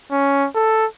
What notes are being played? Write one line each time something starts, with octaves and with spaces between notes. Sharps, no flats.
C#4
A4